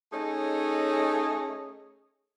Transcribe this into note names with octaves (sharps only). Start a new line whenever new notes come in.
A3 C#4 D#4 G#4 C#5 D#5